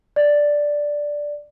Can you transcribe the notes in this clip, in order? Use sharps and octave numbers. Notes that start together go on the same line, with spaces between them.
D5